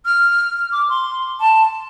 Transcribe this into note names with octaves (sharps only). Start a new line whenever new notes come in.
F6
D6
C6
A5